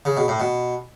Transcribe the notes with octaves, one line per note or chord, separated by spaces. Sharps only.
C#3
B2
A2
B2